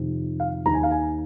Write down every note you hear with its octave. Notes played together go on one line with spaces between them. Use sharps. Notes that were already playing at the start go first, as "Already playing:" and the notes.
Already playing: F2 C3 D#3
F5
D#2 D#3 A#5
G#5
F5
G#5